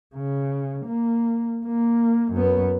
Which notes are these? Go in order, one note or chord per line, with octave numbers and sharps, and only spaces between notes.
C#3
A#3
A#3
F#2 B3